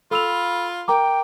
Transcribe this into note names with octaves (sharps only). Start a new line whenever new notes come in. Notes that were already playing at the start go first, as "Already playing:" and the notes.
F4 A4 B5 E6 F7
A#4 G5 A#5 D6